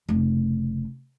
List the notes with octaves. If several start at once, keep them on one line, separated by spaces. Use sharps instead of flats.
F1 C#3